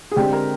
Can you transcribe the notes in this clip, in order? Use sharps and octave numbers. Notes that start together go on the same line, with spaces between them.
G#4
D3 G#3 C4 G4
A#4